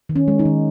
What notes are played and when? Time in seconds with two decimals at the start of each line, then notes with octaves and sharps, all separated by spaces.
0.09 D#3
0.16 C#4
0.28 G#3
0.39 D#4
0.45 D#3